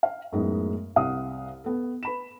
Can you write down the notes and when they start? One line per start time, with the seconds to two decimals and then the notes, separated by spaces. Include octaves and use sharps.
0.03 F5
0.32 F#2 A2 G#3 B3 D#4
0.96 C2 F5 F#5 D#6
1.64 B3 A4
2.03 B4 B5 E7